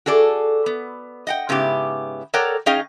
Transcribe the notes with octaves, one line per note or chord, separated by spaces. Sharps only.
F#4 G#4 A4 D5
B3
D#5 F#5 G5
G#2 C#3 B3 E4 G4
A4 A#4 C#5 D5 F#5 G5
C#4 D#4 G#4 D#5 F5 G5